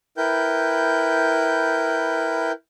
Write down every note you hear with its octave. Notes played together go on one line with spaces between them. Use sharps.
E4 A#4 B4 G5 G6